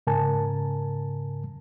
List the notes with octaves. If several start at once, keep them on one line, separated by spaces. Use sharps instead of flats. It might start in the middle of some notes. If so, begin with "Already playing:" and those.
G#2 C#3 A#4 G#5 A5